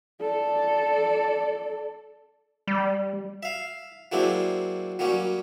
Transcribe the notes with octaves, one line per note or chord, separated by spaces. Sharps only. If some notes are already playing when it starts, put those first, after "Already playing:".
A4 D5
G3
E5 F5
F#3 G#3 A#3 C4 D4 E4
F#3 G3 A#3 C#4